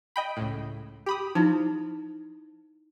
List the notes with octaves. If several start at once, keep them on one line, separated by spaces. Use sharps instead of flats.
D#5 G5 B5
C#2 A2
G4 B5 D#6
F3 D#4 E4